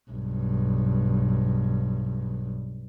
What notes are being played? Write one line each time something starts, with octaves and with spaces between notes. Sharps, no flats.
B1 G2